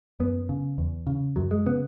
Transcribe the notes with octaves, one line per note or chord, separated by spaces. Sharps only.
F#2 B3
C#3
E2
C#3
F#2 F#3
G#3
C#3 B3